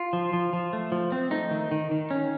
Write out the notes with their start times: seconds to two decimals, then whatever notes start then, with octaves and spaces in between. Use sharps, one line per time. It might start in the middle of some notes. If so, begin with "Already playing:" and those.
Already playing: F4
0.13 F3
0.33 F3
0.53 F3
0.73 A3
0.92 F3
1.12 C4
1.31 A3 D#4
1.51 D#3
1.71 D#3
1.91 D#3
2.11 C#4